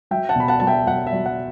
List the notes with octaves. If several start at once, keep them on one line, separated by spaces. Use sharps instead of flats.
F#3 E5 G5
F#5 A5
B2 B5
F#5 A5
F#3 A5
E5 G5
F#3 F#5
E5
F#3
F#5